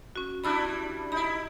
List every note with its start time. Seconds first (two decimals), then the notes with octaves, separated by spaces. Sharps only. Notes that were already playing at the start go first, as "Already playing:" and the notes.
0.16 C#4 F#4
0.44 G3 D4 E4 B5 E6 F6
1.12 D#4 E4 B5